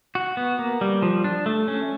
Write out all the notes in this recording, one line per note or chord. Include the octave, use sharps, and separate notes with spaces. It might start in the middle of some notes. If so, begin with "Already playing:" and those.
F#4
B3
A#3
G3
F3
D4
A3
C#4